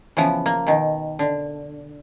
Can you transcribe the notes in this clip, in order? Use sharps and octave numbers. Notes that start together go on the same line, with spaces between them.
C#3 E3 F3 B3
A#3
B2 D#3
D3